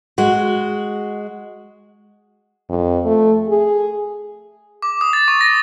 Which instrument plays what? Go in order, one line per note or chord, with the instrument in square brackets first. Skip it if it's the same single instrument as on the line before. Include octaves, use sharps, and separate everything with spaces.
[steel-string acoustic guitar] G#3 F#4 [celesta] F#5
[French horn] F2
A3
G#4
[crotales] D6
D#6
A6
C#6
A#6